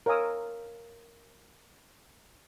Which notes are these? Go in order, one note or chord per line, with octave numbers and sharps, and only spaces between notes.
A#4 C#5 F5 G#5 D#6 E6